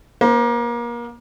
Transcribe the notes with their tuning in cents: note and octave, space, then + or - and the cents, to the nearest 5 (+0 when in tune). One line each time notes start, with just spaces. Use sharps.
A#3 +30 C5 +0